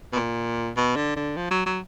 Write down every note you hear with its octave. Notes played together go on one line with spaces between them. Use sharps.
B2
A#2
B2
D3
D3
F3
F#3
F#3